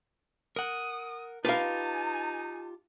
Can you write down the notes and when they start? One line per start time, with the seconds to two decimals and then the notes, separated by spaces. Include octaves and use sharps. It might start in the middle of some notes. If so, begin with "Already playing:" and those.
0.56 A#4 F#5 D#6
1.45 D#4 F4 G4 B4 F5 A5